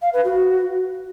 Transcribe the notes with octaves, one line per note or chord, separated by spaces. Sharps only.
F5
B4
F#4